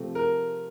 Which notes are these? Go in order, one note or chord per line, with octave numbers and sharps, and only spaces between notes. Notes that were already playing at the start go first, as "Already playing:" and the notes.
Already playing: C3 F3 A3 C4
A#4